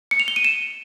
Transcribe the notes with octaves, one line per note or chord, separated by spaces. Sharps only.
C#7
F7
G7
D#7
E7